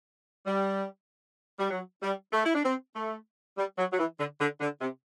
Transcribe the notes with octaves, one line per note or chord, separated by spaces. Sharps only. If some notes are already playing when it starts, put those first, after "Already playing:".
G3
G3
F#3
G3
A3
E4
D4
C4
A3
G3
F#3
F#3
E3
D3
D3
D3
C3